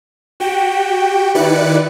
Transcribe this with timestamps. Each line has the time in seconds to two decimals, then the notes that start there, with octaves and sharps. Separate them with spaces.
0.40 F#4 G4 G5
1.35 D#3 E4 B4 D5 F#6 C#7